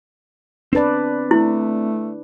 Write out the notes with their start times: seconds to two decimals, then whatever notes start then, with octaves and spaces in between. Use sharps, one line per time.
0.73 C4 D4 B4 D5 A5
1.31 A3 E4